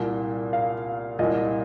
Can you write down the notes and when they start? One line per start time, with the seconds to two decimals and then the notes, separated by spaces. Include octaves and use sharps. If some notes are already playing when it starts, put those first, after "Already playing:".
Already playing: C2 A#2
0.53 F5
1.19 C2 A#2 D#5